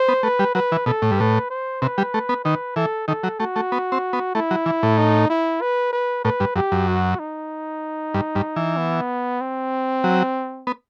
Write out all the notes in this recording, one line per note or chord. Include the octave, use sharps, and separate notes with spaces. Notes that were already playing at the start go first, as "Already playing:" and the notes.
Already playing: C5
B3
A3 B4
G3
F#3 B4
E3
B2 A4
A2
G2
A2 B4
C5
C3 B4
G3
A3
B3
D#3 B4
E3 A4
D#3 A4
F#3
A3 F#4
A3
B3
C4
B3
A3 E4
F#3
E3
A2
D#4
E4
B4
B4
A2 B4
G2
F#2 G4
F#2
F#4
D#4
G2
G2
E3
B3
C4
F#3
B3